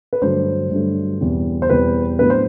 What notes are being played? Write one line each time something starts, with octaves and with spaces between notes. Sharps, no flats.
B4
G2 D3 F#3 A3 D4 C5
G2 D3 F#3 A3 D4
E2 B2 G3 C4
C5
E2 B2 G3 C4 B4
A2 F#3 B3 D4 B4
C5